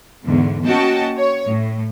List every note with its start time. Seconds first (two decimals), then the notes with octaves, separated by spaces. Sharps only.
0.24 E2 G#2 D3
0.66 A#3 C#4 F#4 D#5 G5 A5
1.18 C#5
1.48 A2